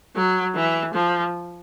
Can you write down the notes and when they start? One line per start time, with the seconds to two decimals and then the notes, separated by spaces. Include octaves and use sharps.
0.16 F#3
0.55 E3
0.94 F3